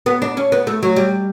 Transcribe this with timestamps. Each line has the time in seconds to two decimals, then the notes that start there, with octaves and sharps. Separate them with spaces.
0.06 B3
0.22 D4
0.37 C#4
0.52 B3
0.67 A3
0.83 F#3
0.96 G3